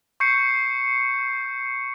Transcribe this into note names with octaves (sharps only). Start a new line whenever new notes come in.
C#6 G6 C7 C#7